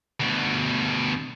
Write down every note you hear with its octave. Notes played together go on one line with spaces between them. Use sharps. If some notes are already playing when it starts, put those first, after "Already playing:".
D2 B2